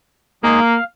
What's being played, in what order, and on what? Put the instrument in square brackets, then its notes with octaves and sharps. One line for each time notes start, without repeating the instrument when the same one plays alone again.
[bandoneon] G#3 D#4 G#4 [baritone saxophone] A#3
[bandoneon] F5